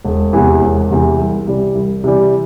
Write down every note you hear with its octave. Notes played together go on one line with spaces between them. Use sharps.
E1
E2 C3 E3
E1
E2 C3 E3
C2
C3 E3 G3
C2
C3 E3 G3